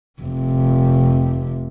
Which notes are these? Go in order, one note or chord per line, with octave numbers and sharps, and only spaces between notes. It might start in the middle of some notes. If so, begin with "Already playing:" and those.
F1 C3